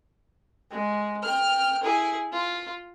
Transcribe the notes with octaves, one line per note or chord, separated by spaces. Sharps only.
G#3
G5 F6
E4 G#4
F4